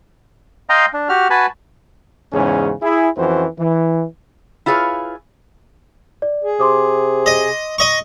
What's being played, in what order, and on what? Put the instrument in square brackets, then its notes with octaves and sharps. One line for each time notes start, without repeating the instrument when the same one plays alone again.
[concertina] D#5 F5 G5 A#5 C6
D4
F#4 G4 F6
F#4 B4 G#5 A5 B5
[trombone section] E2 G#2 C#3 C#4 G#4
E4 G#4
F2 E3 C#4 F#4 C5
E3
[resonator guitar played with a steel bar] E4 F4 G#4 B4 C#5 F5
[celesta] D5
[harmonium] G#4
[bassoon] C3 [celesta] C6 D6 D#6
[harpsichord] D#5
D#5 C#6